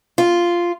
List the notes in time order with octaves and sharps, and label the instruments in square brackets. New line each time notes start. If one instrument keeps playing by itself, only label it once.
[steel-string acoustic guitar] F4